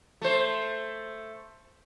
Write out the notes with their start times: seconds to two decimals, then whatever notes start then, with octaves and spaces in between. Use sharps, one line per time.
0.22 A3 C5